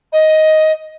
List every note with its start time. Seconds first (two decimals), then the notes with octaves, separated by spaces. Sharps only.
0.12 D#5